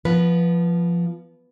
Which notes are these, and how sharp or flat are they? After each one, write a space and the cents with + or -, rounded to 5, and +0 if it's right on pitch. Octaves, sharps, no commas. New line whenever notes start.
F3 -10 B3 +0 B4 +0